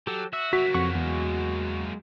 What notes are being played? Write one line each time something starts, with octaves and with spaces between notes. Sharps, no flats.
F#3 G4 A4
F#4 E5 E6
F#3 A#3 F#4 B6
F2 F#5 C#6
E2 G#3